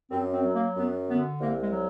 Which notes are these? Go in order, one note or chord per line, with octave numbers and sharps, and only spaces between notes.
F#2 C4
C4
F#3
A#3
F#2 B3
D3 B3
C2 A#3
G#3
F#3